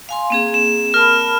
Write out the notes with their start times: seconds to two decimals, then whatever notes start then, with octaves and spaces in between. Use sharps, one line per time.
0.09 F5 G#5 C6
0.30 A#3 C4 G#4
0.54 E7
0.94 A#4 A5 B5 F6